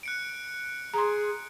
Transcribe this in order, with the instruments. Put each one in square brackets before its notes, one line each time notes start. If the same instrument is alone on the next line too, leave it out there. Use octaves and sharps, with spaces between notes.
[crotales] F#6 C#7 D7
[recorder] G#4 [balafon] A#5 C6